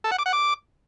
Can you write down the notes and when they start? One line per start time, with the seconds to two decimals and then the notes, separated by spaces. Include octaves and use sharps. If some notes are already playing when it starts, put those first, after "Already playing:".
0.04 A4
0.11 F#5
0.19 D6
0.26 F#5
0.33 D6